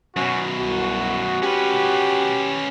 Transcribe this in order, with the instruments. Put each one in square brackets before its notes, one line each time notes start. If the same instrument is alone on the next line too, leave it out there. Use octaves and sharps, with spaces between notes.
[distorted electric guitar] F#2 B2 [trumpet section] C#4 F#4
[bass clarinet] C2 [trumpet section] F#4
[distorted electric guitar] C#4 B4 [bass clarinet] G4